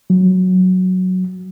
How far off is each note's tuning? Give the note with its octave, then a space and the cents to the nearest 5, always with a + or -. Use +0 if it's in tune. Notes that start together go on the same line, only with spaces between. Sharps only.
F#3 +0